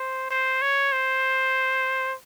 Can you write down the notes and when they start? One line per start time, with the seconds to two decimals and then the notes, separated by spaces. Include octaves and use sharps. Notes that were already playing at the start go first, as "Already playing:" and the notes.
Already playing: C5
0.31 C5
0.62 C#5
0.92 C5